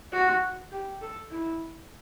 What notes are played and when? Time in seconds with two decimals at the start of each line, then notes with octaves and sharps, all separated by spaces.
0.12 F#4
0.72 G4
1.01 A4
1.31 E4